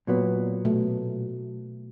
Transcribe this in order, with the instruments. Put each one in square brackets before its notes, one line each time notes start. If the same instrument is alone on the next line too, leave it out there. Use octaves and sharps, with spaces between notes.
[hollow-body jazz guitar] A#2 F#3 B3
[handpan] B2 A3